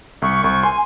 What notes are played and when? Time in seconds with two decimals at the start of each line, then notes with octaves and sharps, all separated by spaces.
0.22 C2 C#6
0.44 C2 C#6
0.63 G#5 C6